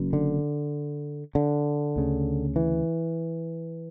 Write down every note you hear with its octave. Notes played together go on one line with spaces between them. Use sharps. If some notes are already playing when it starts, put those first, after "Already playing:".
Already playing: F#1 F#2
D3
D3
D2 C#3
E3